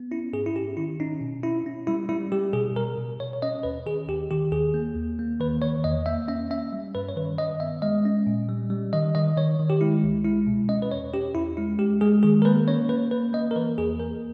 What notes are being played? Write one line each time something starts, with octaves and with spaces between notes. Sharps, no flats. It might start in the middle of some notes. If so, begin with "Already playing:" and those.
Already playing: B3
C#4 E4
G#2 G#4
E4
C#4 G4
D#3 E4
C#4 D#4
B2
C#4 E4
C#4
G3 E4
G3 E4
G3 G4
B2 G#4
B2 A#4
B2
B2 C#5
C#5
C#4 D#5
D#2 B4
D#3 G#4
D#2 G4
D#3 G4
D#2 G#4
A#3
D#2
A#3
D#3 B4
D#3 C#5
E2 D#5
A#3 E5
C#4 E5
C#4 E5
G3
G2 B4
C#5
D#3 B4
D#3 D#5
B3 E5
G#3 D#5
C#4
A#2
G3
G3
D#3 D#5
D#3 D#5
D#3 C#5
D#3
G4
G#3 E4
C#2
G#3 E4
B2
C#4 D#5
B4
E2 C#5
C#4 G4
E2 E4
G#3 E4
G#3 G4
G#3 G#4
D#3 G#4
A#4
A#3 B4
C#4 C#5
A#3 B4
A#3 B4
A#3 D#5
A#4
E3 B4
E2 G#4
A#3 A#4